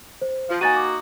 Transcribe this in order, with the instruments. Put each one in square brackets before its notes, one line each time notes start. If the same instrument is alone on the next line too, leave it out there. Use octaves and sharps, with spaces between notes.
[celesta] C5
[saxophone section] F3
[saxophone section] A#3 D#4 F#4 [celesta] G#5 A6 D#7
[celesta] D6